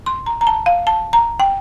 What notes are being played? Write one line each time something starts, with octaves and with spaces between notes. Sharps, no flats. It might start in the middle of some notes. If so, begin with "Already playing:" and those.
C6
A#5
A#5
A5
F5
A5
A#5
G5